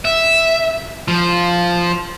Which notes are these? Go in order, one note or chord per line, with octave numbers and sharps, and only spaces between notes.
E5
F3